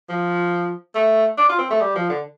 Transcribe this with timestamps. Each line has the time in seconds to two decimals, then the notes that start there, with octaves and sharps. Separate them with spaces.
0.09 F3
0.95 A3
1.37 D4
1.49 F4
1.59 C4
1.70 A3
1.81 G3
1.96 F3
2.09 D3